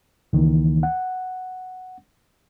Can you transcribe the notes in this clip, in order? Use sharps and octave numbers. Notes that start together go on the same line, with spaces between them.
C#2 D#3 E3 A#3
F#5